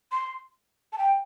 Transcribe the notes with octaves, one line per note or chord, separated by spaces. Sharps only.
C6
A5
G5